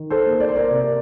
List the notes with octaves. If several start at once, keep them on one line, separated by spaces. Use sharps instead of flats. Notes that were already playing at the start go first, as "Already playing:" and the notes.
Already playing: D#3
A4 C5
A#3
D5
C5
A#4 D5
C3